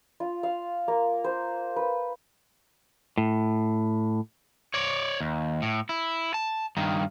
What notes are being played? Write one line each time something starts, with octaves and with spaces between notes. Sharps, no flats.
F4
F5
A#3
C5
B4
A2
C#5 D5
D#2
A2
E4
A5
G2 D#3